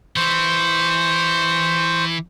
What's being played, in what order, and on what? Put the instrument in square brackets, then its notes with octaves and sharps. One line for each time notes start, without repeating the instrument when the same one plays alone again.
[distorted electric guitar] E3 [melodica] C5 C#6